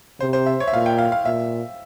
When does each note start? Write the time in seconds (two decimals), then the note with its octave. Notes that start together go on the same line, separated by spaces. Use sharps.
0.20 C3 C5
0.33 C5
0.46 E5
0.60 C#5
0.67 E5
0.73 A#2 F5
0.86 G5
0.98 F5
1.12 F5
1.25 A#2 E5